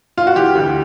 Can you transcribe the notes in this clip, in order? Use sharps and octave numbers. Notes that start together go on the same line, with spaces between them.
F4
F#4
E3 G4
D2